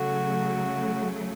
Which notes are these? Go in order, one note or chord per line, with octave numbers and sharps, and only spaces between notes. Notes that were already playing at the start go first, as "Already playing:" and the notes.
Already playing: C#3 F#3 A3 F#4